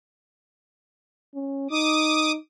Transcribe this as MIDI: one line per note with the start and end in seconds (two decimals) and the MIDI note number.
1.35 1.70 61
1.71 2.37 63
1.71 2.32 86
1.71 2.32 87